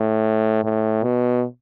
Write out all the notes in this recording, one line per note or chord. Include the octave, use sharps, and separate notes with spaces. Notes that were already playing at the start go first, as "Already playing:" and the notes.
Already playing: A2
A2
B2